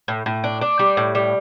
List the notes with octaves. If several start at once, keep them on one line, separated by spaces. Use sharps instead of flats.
A2
A2
D4
D4
G3
A2
G3